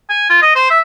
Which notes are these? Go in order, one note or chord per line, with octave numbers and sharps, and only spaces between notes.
G#5
F4
D#5
C5
E5